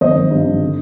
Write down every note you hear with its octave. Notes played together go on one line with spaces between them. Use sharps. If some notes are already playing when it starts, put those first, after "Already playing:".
G#1 C5 D#5
G#1
G2
G#1
D3